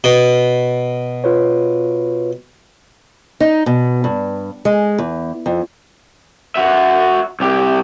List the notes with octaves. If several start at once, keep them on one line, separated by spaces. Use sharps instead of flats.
B2
F4 B4 C#5
D#4
B2
G2
G#3
E2
F2
F#4 E5
C2 G4